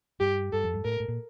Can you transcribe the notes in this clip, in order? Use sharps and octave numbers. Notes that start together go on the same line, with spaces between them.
G2 G4
G2 A4
F2
G2
A2 A#4
A2
A#2